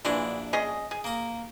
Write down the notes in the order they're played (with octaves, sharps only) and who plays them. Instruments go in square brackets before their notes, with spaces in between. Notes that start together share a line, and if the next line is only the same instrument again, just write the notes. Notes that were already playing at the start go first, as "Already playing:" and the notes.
[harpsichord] A#1 D4 E4 [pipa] E3 F#3 G#3
[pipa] C#4 G#4 D#5
G#4
[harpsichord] A#3 A#4